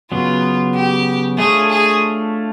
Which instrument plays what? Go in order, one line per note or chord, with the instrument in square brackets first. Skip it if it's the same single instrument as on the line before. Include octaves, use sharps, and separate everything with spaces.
[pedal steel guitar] C#3 F#3 B3 [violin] F4
[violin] G4
[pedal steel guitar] A3 D4 F4 A4 C#5 [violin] G#4
[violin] G#4